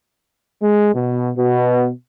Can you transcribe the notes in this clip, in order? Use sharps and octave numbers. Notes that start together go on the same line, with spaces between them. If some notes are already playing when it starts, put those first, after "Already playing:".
G#3
B2
B2